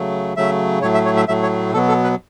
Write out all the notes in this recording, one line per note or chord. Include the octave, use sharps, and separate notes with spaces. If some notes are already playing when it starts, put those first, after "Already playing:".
Already playing: C#3 F#3 A3
C#3 F#3 A3 E5
A2 F#3 A3 C#5
E5
C#5
E5
A2 F#3 A3 E5
C#5
B2 F#3 B3 A4
A4
B4